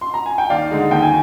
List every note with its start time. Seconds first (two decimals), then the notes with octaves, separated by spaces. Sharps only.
0.01 C6
0.14 A#5
0.26 G#5
0.38 G5
0.50 D#2 D5 F5
0.70 D3 G#3 D#4
0.91 D#2 G5
1.02 G#5